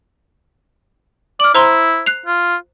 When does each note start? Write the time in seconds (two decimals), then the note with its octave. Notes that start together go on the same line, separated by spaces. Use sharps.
1.40 D5 F6 F#7
1.55 E4 C5 A#5 C6
2.06 F#6 C7 F7
2.26 F4